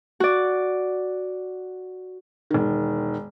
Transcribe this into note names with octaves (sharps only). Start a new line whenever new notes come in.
F#4 D5
E1 D#3